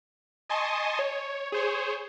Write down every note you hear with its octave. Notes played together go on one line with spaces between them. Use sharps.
D#5 G#5 A5 C6 C#6 D#6
C#5
G#4 C5 C#5